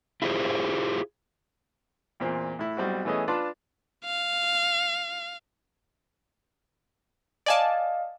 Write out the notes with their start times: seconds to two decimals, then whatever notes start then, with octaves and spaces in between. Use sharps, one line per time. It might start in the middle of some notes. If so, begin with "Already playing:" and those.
0.22 E4 F4 G4 G#4 C5
2.20 E2 A#2 C4
2.59 A2 E4
2.77 B1 G3 C4 F#4
3.05 E3 A3 B3 C#4 G#4 D#5
3.28 D4 F4 B4 D5 A5 C6
4.05 F5
7.46 D5 D#5 F5 G#5 A5